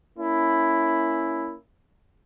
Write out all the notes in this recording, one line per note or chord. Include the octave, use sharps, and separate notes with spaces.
A#3 C#4 E4